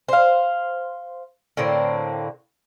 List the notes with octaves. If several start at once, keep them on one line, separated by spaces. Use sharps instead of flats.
C5 F5
A2 D3 A#3 C4